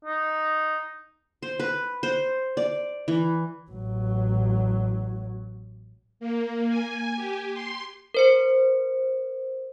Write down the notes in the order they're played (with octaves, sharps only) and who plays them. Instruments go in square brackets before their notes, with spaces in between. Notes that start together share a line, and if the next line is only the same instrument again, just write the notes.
[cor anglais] D#4
[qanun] C5
B4
C5
D5
E3
[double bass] A1 F#3
[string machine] A#3
G#5
G4
C6
[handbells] A#4 C5 C#7